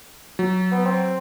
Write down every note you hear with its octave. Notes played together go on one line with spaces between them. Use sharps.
F#3
B3
C4